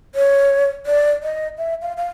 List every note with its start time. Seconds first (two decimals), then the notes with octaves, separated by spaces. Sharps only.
0.15 C#5
0.86 D5
1.23 D#5
1.58 E5
1.82 F5
1.97 F5